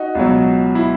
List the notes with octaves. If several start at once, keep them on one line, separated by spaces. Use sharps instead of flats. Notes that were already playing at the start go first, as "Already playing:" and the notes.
Already playing: D#4 F#4
C#2 B2 F#3
E4